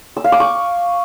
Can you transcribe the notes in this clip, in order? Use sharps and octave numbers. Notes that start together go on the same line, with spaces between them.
E6
F5
D6
C#6